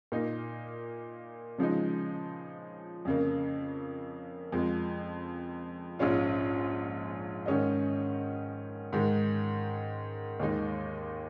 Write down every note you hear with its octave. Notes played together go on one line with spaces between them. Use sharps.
A#2 A#3 D#4
C#3 F3 G#3 D#4
F2 C#3 A#3
F2 F3 G#3
A#1 G#2 G#3 C#4 F4
G#2 D#3 C#4 G#4 D#5
G#2 D#3 G#3
D#2 D#3 G#3 D#4